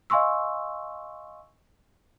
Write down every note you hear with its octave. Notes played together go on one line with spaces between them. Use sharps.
D#5 F5 G#5 C6 C#6 E6